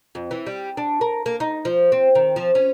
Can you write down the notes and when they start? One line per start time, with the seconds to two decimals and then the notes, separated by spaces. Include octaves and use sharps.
0.15 F2
0.31 E3
0.46 G3
0.77 D4
1.01 A#4
1.26 A#3
1.40 D#4
1.65 F3
1.92 C4
2.15 D#3
2.36 F3
2.55 C#4